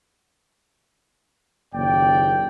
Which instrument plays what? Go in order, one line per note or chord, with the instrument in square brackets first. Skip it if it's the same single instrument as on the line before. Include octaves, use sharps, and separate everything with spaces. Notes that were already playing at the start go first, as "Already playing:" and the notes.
[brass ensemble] F#1 D#2 A#2 D5 G5